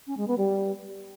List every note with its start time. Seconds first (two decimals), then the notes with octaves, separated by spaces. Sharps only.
0.07 C#4
0.17 G#3
0.28 B3
0.38 G3